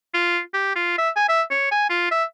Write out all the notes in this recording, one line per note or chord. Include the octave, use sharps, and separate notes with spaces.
F4
G4
F4
E5
G#5
E5
C#5
G#5
F4
E5